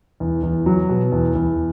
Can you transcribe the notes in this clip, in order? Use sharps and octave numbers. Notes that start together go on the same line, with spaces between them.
E2
E2
F#3
B2
E2
E2